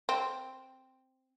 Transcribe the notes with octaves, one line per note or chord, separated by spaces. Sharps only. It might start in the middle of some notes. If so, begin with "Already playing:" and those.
C4